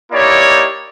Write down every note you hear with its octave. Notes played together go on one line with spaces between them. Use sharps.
A#3 D#4 E4 G4 C#5 D5